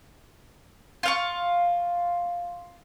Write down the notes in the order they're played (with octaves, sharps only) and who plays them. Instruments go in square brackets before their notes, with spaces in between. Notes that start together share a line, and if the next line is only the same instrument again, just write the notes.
[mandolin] F4 F5 C#6